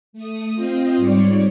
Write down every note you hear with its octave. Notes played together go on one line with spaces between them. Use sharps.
A3 D#6
C4 F4 C5 D#5
G#2 G3 C#5 D5